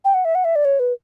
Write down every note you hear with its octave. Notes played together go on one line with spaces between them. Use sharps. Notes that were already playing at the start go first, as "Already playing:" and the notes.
G5
F#5
E5
F#5
E5
D5
C#5
B4